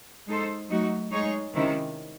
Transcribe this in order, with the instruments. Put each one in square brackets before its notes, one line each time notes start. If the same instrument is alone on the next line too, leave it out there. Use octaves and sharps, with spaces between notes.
[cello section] G#3 D#4 A4 C5
F#3 A3 D#4 F#4
G#3 D#4 G#4 C#5
C3 D#3 G#3 C#4 E4